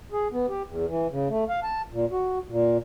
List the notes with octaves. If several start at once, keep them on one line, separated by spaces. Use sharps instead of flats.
G#4
B3
G4
E2
E3
C#3
A3
F5
A5
A#2
F#4
A#2